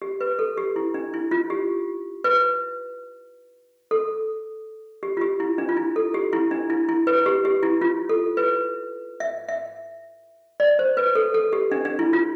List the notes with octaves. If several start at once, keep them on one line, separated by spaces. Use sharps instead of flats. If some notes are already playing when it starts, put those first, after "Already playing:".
G4
B4
A4
G4
E4
D4
E4
F4
G4
B4
A4
G4
F4
G4
E4
D4
F4
E4
A4
G4
E4
D4
E4
E4
B4
G4
G4
E4
F4
A4
B4
E5
E5
D5
C5
B4
A4
A4
G4
D4
D4
E4
F4